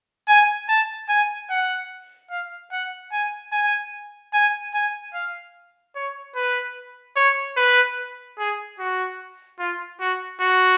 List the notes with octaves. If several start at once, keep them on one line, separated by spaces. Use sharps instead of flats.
G#5
A5
G#5
F#5
F5
F#5
G#5
G#5
G#5
G#5
F5
C#5
B4
C#5
B4
G#4
F#4
F4
F#4
F#4